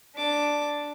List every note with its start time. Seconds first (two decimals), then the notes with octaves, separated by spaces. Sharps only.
0.16 D4 D6